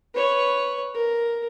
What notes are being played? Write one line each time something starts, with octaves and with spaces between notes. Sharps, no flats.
B4 C#5
A#4